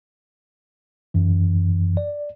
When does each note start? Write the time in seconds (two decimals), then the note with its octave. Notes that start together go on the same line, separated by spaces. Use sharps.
1.14 F#2 E3
1.97 D5